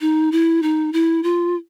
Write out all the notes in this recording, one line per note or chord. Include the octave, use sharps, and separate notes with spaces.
D#4
E4
D#4
E4
F4